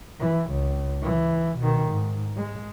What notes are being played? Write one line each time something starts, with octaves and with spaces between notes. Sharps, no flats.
E3
C#2
E3
B2 D#3
G#2
G#3